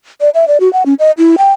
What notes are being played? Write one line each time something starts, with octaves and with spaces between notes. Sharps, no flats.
D5
E5
D5
F#4
F#5
C#4
D#5
E4
G5